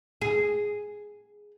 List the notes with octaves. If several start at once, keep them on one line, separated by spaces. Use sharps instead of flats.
G#4